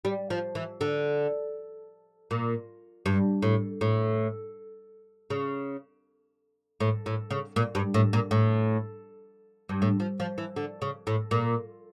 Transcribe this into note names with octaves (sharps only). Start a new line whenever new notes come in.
G3
F3
E3
D3
A#2
G2
A2
A2
C#3
A2
A2
C#3
A#2
G2
A2
A#2
A2
G2
A2
F3
F3
E3
D3
C#3
A2
A#2